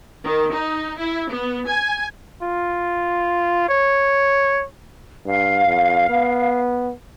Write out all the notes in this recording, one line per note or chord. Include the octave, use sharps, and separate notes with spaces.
D#3
D#4
E4
B3
G#5
F4
C#5
G2 F5
F2
B3